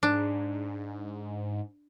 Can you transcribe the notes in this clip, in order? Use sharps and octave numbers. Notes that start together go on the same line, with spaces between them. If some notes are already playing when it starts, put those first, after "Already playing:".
G#2 D4